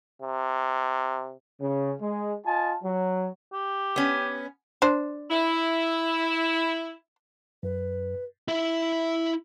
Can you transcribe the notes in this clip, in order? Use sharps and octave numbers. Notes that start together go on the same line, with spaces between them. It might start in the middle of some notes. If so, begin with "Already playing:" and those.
C3
C#3
G#3
F4 D#5 G#5 A5
F#3
G4
B3 C#4
D4 C5
E4
F#2 B4
E4 E5